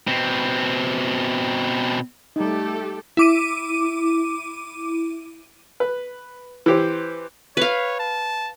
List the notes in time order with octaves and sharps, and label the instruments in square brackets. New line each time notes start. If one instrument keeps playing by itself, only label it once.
[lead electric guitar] B2 C4
[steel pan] G3 D#4 [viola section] A3 G4 A4
[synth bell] E4 D6 D#7
[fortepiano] B4
E3 G4 C5
[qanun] B4 F5 [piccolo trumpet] C#5
[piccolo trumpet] A5